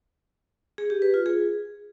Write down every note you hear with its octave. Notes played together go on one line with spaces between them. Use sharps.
G#4
G4
B4
F4
G#4